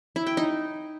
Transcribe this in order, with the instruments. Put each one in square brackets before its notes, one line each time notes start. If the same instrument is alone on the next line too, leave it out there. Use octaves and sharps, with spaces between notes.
[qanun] E4
G5
D#4